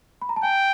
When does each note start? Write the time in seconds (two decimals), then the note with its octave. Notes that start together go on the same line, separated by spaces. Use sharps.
0.22 B5
0.29 A#5
0.36 A5
0.43 G5 G#5